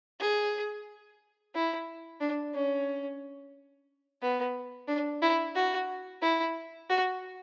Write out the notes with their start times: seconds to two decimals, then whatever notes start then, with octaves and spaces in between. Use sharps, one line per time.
0.19 G#4
1.54 E4
2.20 D4
2.54 C#4
4.22 B3
4.87 D4
5.22 E4
5.55 F#4
6.22 E4
6.89 F#4